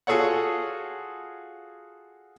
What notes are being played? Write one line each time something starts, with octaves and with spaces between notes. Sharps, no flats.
F4 F#4 G#4 A4 C#5 F#5